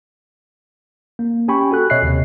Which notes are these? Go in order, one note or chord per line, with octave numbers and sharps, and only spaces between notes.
A#3
C#4 G4 G5 G#5 B5 C#6
F#4 A4 F#6
B2 C#5 D#5 E5 F#6 C7
D#2 C3